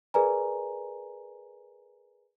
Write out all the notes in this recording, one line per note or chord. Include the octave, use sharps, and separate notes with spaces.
G#4 A#4 B4 D5 G#5 A#5